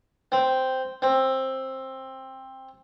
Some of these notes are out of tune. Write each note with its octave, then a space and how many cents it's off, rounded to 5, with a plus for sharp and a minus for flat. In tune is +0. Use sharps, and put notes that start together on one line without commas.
C4 -5
C4 +15